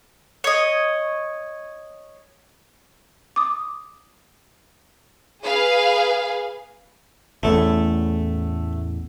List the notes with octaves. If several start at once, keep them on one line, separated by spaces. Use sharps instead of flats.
C#5 D#5
D6 D#6
G#4 B4 F5
A1 E2 A2 A3 A4